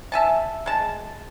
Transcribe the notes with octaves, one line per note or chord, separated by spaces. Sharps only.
E5 G#5 A5
G#3 A5